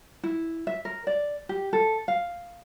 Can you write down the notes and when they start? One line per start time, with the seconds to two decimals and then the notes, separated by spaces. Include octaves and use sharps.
0.23 E4
0.67 E5
0.85 A#4
1.07 D5
1.49 G4
1.73 A4
2.08 F5